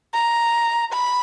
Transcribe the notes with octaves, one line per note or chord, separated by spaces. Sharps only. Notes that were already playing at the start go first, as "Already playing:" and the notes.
A#5
B5